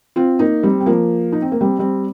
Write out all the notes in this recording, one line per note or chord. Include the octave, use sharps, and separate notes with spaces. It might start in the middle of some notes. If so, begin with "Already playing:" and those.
C4 F4
A#3 D#4
G3 C4
C4
F3 A#3
D#4
C4
A#3
G3 C4
G3 C4